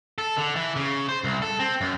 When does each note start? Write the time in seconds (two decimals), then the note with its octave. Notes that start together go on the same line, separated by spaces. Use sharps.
0.18 A4
0.38 D3
0.56 E3
0.76 C#3
1.09 C5
1.24 C2
1.42 A4
1.59 C4
1.81 F#2